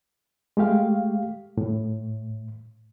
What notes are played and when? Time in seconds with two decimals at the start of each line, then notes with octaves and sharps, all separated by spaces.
0.57 G#3 A3 G4 F5
1.57 A2